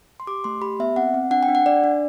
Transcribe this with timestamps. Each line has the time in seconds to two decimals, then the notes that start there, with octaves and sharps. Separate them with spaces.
0.20 C6
0.27 G4 D6
0.44 A3 C6
0.61 G4 B5
0.79 B3 E5
0.96 C4 F#5
1.14 C4
1.31 D4 F#5
1.43 G5
1.48 D4
1.55 F#5
1.66 D4 D5
1.84 D4